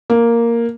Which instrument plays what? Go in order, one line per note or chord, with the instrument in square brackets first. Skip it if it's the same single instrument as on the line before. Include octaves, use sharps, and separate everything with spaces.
[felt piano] A#3